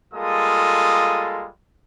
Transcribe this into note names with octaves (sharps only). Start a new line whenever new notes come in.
G3 G#3 A#3 F4 A4 D#6